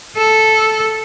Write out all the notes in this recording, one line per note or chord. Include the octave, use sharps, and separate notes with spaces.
A4